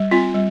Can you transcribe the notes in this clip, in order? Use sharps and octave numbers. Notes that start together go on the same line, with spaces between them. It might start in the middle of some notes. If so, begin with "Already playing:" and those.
Already playing: G3
C4 F4
G3